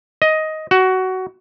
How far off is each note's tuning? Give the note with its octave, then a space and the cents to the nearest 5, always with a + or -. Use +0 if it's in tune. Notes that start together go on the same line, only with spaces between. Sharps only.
D#5 +10
F#4 +15